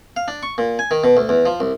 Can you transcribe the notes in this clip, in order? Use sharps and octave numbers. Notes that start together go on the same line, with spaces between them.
F5
D4
C#6
A#2
G#5
D#3
B2
D2
E2
F3
C2